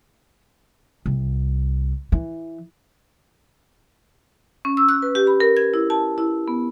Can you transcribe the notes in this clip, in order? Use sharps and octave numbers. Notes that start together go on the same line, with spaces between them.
C2
E3
C#4
E6
F#6
B4
G4
B5
A#4
G#6
E4
A5
E4
B3